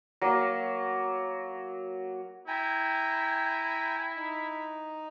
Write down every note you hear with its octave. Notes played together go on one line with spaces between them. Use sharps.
F#3 A#3
E4 G5 G#5 A#5
D#4